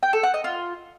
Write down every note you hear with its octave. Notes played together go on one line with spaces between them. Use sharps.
G5
A4
F#5
D#5
F4